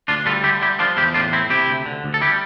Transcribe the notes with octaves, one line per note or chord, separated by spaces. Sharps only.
D2 D4 F4
G3 F4 A4
D3 E4 G4
G3 E4 G4
F3 D4 F4
E2 E4 G4
A2 D4 F4
A2 C4 E4
C3 E4 G4
D2
D3
D2
A4
G3 E4 G4